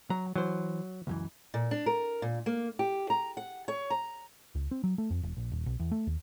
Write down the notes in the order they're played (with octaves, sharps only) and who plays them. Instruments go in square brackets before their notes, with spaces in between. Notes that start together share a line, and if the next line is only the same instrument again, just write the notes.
[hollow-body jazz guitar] F#3 [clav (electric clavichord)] A#5
[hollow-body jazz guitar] E3 C5 [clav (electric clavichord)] F#3
[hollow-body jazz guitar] C#2 F#2 E3
[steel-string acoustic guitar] A#2
D4
A#4
A#2
A#3
G4
A#5
F#5
C#5
A#5
[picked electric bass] C#2
C4
F#3
A3
F2
E1
A#1
D#1
B1
E2
A3
D#2